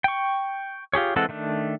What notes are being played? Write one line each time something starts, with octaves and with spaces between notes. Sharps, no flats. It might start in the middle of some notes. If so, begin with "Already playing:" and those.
G5 C#6
F4 G4 G#4 C#5
E3 G#3 C4 A4 F#5
D#3 A3 D4